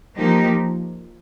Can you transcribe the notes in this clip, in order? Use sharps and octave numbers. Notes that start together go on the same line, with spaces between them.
F3 A#3 D#4 G4